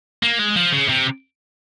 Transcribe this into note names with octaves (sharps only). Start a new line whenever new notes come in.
A#3
G#3
F3
C#3
C3